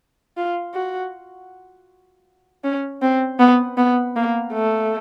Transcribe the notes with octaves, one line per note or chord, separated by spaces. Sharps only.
F4
F#4
C#4
C4
B3
B3
A#3
A3